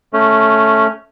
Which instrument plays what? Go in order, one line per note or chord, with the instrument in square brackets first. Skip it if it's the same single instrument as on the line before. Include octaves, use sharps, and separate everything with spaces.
[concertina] A3 C#4